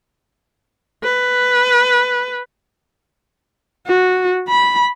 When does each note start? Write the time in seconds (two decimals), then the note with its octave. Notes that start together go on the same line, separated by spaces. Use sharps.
1.04 B4
3.87 F#4
4.48 B5